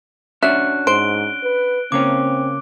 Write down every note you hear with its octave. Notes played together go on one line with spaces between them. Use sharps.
C#4 D4 F#4 E5 F#6
G#2 C5 D7 G7
B4
C#3 A#3 C4 C#4 D6